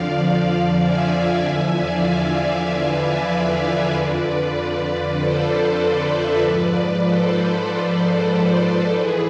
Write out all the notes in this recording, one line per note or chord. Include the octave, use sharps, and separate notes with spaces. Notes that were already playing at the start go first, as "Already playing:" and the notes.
Already playing: F2 D3 F3 D5 F5
D5 F5
E5 G#5
E2 D3 F3 E5 G#5
D5 F5
D5 F5
B4 D5
B4 D5
F2 D3 F3
A4 C5
B4 D5
C5 E5
G#2 F3 B4 D5
A4 C5
A4 C5
B4 D5
A4 C5
G#2 E3 G#4 B4